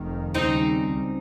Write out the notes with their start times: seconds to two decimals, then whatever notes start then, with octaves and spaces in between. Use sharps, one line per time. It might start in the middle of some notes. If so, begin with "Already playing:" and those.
Already playing: F1 F2 D#3
0.34 D#2 C#3 G3 C4 D#4
0.90 C#2